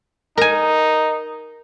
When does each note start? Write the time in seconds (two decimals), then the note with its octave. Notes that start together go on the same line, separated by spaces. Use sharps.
0.37 D#4 A#4 G#5